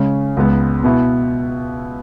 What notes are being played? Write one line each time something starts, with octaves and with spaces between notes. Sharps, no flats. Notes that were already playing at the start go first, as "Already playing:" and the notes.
Already playing: C#3 G#3 C#4
C#2 C#3 G#3 B3
B2 B3 E4